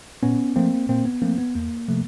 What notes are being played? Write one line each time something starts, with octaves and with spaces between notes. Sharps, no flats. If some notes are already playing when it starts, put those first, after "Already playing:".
A#2 B3 C#4
F3 A3 A#3 C4
A#2 A#3 C4
B3
F3 A3 A#3 C4
B3
E2 A#3
C3 F3 A3